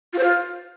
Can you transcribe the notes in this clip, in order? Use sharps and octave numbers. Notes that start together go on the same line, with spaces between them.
F4
C5
F4